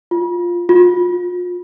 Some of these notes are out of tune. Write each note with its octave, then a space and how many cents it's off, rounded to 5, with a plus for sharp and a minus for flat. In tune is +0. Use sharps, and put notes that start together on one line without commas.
F4 +5
F4 +30